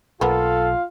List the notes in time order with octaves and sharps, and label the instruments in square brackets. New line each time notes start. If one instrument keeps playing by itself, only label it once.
[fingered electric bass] B1 [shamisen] A#3 B3 [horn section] F4 F5 [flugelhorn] A4